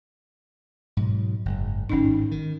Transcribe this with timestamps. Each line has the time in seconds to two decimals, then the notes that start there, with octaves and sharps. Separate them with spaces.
0.97 G#2 B2 F#3
1.45 F#1 G#2
1.89 G#1 A2 C#4 D#4
2.31 D#3